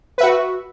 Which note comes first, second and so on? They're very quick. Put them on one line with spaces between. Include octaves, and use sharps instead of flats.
B4 E5 F#4